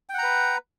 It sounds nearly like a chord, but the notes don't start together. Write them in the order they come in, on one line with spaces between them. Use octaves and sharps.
G5 F#5 A#5 B4